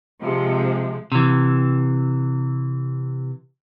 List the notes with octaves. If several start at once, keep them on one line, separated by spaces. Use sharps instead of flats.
C3 F3 G#3
C3 E3